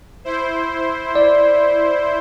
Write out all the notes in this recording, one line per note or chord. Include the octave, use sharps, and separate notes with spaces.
E4 C5
D5